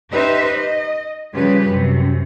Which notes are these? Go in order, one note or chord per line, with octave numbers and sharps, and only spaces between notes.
D#4 G4 B4 C5 E5
D#5
C#3 F3 G3 G4 B4
F#2 C3